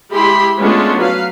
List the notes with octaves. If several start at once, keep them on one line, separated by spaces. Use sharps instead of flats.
G#3 E4 G4 B5 C6
G#3 A3 B3 C#4 D4 F4
F#3 B4 F5